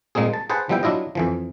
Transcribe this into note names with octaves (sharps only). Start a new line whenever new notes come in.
A#2 G#3 A#3 C4 G#4
A5
G#4 B4 C5 F#5 A5
F3 G3 B3 E4 G5
F#3 D4 E4 F4 D#5
F2 E3 F3